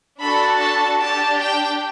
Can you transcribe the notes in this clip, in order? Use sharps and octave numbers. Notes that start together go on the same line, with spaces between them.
D4 F#4 A4 B5
A5
D4 G4 A5
G5